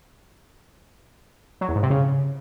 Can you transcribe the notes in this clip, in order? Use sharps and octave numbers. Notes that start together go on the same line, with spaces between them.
F#3
E2
G#2
C3
C#3